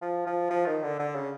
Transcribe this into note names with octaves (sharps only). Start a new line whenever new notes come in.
F3
F3
F3
D#3
D3
D3
C#3